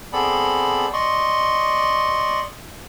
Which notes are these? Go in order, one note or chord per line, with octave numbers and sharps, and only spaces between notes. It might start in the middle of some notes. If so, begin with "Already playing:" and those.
B3 C4 G#4 A4 D5 B5
D5 D#5 C6 C#6